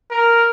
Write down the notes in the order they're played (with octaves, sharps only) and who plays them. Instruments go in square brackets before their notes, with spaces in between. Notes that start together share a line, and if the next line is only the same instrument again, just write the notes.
[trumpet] A#4